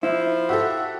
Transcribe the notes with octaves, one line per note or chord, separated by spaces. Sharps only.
F3 E4
F#4 G4 A4 E5